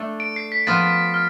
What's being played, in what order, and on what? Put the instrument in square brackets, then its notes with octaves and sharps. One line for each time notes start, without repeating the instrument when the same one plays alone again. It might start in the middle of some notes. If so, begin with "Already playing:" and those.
Already playing: [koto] A3 D4 A4
[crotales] D7
C7
B6
[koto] F3 B3 F4 [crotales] A6
[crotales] F6